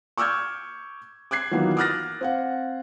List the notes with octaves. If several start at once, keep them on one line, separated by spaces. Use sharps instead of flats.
C#6 D6 E6 F6 G6 G#6
D6 F#6 G#6 C7
D#3 E3 F#3 A#3 B3 F4
D6 D#6 F6 F#6 A6 A#6
C4 F5 F#5